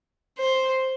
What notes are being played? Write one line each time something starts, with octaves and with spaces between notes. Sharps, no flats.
C5